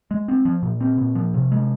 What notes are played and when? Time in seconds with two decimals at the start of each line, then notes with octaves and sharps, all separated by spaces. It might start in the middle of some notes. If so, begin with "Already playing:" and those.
0.11 G#3
0.28 C4
0.45 F3
0.63 A#2
0.81 C4
0.98 A#2
1.15 F3
1.34 C3
1.52 G#3